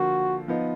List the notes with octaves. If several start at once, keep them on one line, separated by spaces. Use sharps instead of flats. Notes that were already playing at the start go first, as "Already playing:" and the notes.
Already playing: D3 F3 A#3 F4 F#4
F3 B3 D#4